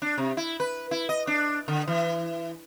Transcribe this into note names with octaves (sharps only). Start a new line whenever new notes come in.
D4
C3
E4
B4
E4
D#5
D4
D3
E3